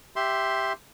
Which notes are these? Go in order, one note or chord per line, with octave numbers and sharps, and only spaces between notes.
G4 E5 C6